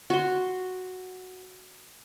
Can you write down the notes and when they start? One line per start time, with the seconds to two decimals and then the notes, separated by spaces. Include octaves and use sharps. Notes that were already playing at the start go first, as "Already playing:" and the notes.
0.10 F#4 C6